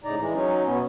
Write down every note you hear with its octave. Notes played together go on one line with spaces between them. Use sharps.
A2 C#3 D#4 D5 A#5
E3 G#3
F#3 C#4 D#4
B2 B3 C#4